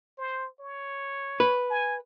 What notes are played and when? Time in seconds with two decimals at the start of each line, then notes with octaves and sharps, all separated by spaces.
0.18 C5
0.60 C#5
1.40 B4
1.70 G#5